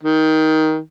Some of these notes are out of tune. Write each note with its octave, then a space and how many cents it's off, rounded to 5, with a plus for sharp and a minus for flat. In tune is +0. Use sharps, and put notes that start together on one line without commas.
D#3 +15